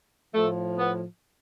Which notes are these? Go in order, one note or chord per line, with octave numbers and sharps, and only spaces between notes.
A2 F3 A3
B3